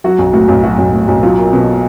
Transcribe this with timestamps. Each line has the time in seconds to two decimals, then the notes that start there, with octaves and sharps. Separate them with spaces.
0.04 F#3 F#4
0.19 B1
0.33 A2 F#4
0.48 B1
0.63 F#3 F#4
0.78 B1
0.93 A2
1.08 B1
1.23 F#3 F4
1.37 A#3
1.53 B2